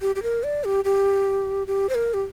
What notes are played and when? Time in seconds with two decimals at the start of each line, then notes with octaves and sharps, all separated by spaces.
0.02 G4
0.16 G4
0.23 A#4
0.44 D5
0.64 G4
0.85 G4
1.67 G4
1.89 C5
1.95 A#4
2.14 G4